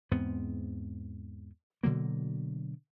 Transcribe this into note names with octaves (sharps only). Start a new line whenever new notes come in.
E2 G#2 B3 C4
B2 D3 F#3 A#3